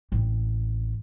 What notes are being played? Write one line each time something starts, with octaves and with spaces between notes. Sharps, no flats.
A1 C4